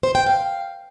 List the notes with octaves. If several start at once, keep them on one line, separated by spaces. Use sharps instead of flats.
C5
G5
F5